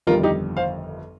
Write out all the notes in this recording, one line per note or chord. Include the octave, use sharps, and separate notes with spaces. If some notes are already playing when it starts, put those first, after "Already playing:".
G1 F2 D#3 G3 F4 A#4
D#4 G4
C5 F5